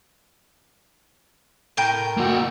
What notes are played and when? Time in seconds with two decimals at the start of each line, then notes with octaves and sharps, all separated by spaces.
1.77 A2 A#4 G5
2.17 A#3 F#4